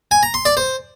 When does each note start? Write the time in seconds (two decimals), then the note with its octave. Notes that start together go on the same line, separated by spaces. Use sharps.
0.11 G#5
0.23 A#5
0.34 C6
0.45 D5
0.57 C5